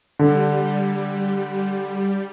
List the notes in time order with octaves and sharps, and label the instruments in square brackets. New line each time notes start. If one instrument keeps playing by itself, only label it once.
[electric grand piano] D3 [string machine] G3